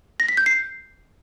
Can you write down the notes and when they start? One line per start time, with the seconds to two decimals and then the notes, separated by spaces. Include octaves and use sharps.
0.20 A#6
0.29 B6
0.37 G6
0.46 C7